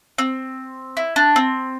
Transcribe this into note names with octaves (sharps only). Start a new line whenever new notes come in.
C4
E4
D4
C4